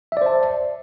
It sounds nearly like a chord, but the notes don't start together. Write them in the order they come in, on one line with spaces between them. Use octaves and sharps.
E5 D5 C5 A5